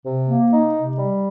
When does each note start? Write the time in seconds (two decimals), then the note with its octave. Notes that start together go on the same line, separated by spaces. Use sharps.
0.04 C3
0.28 A#3
0.51 D#4
0.75 C3
0.97 G3